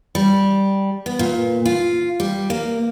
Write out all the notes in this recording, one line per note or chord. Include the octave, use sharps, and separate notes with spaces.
G3
B3
A#2
F4
G3
A#3